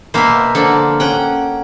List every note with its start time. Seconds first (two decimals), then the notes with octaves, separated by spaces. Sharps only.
0.14 B2 A#3 C5 E5 F5
0.55 D3 F3 A#3 A4
1.00 C#4 F#5 G5